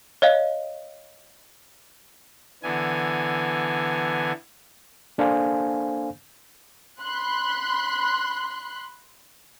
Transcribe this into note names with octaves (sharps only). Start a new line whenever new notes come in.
C#5 D#5 F5
D3 E3 B3 G#5
A#3 D4 A4 C5 F5 G#5
B5 C6 F#6